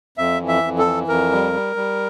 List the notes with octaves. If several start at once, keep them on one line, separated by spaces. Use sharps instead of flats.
F2 E5
E3
E5
F2
A4
E3
F2 A#4
G3
G3
G3